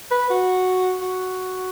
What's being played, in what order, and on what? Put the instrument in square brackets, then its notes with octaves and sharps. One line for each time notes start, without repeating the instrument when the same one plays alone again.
[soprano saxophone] B4
F#4
F#4